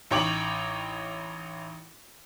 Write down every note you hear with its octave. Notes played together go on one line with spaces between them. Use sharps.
A1 D#4 C#5 G5 D6 F#7